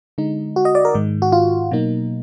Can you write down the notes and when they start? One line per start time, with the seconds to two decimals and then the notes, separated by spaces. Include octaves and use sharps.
0.18 D3 G#3 D#4
0.56 F#4
0.65 D#5
0.75 D5
0.85 A#4
0.94 G#2 D#3 G#3
1.22 F#4
1.32 F4
1.71 B2 F#3 A#3 D#4